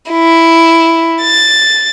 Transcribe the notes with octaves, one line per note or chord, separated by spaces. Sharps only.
E4
A6